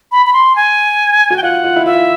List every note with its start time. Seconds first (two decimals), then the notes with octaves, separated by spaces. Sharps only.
0.12 B5
0.26 B5
0.33 C6
0.56 G#5
1.30 F#4
1.37 G5
1.43 F4 F#5
1.64 F4
1.76 E4
1.85 F4 E5